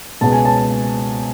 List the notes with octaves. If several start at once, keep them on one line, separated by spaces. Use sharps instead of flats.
C#2 B2 G#3 B3 A5
G#5
A5